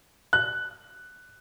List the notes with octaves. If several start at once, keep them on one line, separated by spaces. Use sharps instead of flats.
F#6